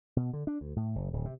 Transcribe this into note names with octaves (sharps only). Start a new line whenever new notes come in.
B2
D3
D4
D2
A2
F#1
D1
C3